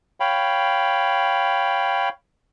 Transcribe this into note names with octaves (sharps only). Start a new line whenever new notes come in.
C#5 F5 G5 B5